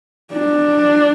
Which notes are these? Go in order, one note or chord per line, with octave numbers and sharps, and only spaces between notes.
D4